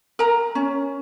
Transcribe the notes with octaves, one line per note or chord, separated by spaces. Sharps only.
A#4 A#5
C#4